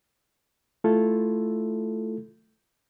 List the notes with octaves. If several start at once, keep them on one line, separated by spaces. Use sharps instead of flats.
A3 E4 F4 A4